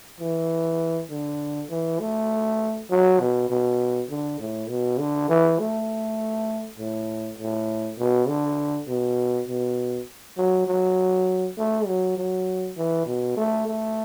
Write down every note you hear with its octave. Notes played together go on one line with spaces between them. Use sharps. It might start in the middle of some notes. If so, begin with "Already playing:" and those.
E3
D3
E3
A3
F#3
B2
B2
D3
A2
B2
D3
E3
A3
A2
A2
B2
D3
B2
B2
F#3
F#3
A3
F#3
F#3
E3
B2
A3
A3